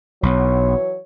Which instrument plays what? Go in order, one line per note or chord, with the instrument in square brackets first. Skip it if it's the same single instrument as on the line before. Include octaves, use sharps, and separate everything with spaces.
[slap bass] B1 [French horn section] E3 F#3 C#5